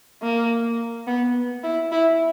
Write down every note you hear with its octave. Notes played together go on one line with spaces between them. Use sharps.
A#3
B3
E4
E4